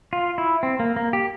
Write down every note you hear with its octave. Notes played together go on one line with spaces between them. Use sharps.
F4
E4
C4
A#3
A#3
G4